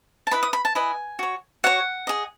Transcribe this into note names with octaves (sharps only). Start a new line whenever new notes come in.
A5
E4 B4 D#5 B5
D#6
B5
A5
E4 B4 D#5 G#5
F#4 C#5
F#4 C#5 F#5
G#4 D#5